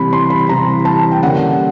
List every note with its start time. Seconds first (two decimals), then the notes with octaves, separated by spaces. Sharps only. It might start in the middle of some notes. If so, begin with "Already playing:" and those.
Already playing: C3 E3 G3 C4 B5
0.13 C6
0.30 B5
0.49 C3 E3 G3 C4 A#5
0.85 A5
1.12 G5
1.22 D3 G3 A#3 C#4 F#5